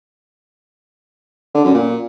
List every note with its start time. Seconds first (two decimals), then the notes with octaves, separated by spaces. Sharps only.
1.55 D3
1.64 F#2
1.74 A#2